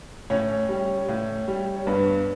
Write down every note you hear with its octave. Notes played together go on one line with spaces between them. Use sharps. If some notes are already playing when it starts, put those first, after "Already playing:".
A2 C#4 C#5
G3
A2
G3
C#5
G2 B3 B4